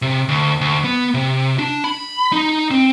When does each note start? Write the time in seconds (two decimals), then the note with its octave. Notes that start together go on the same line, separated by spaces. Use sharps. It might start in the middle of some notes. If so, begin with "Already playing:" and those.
0.02 C3
0.28 D2
0.61 D2
0.84 B3
1.14 C3
1.59 D4
1.84 B5
2.32 D#4
2.71 C4